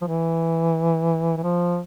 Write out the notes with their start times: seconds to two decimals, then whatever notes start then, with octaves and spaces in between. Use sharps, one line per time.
0.02 F3
0.07 E3
1.37 E3
1.43 F3